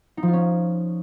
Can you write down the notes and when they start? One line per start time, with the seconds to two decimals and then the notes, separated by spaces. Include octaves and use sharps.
0.17 D#4
0.23 F3
0.28 F4
0.33 C#4